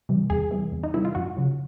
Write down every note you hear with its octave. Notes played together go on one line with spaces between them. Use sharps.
C3 E3 G3
E2 G#4
C3 E3 G3
E2
D#4
C3 E3 G3 E4
F4
F#2 F#4
C#3 F#3